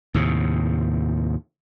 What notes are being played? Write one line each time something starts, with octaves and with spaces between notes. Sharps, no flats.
D#2 A2 C3